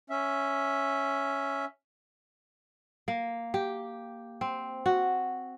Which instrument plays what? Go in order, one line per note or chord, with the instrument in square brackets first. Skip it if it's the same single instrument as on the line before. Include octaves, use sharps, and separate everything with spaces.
[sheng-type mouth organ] C#4 E5
[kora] A#3
G4
C4
F#4